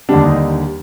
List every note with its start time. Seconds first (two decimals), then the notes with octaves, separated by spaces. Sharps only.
0.09 D#2 D3 G3 D4
0.25 D#4